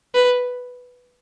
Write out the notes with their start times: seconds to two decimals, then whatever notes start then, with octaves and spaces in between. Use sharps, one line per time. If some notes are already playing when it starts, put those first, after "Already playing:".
0.15 B4